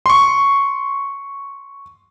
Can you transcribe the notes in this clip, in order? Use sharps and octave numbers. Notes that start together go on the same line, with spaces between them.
C6 C#6